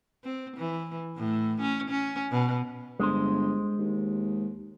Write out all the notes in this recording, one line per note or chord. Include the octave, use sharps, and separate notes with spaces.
C4
E3
A2
C#4
C#4
B2
G1 G#3 C5
D#2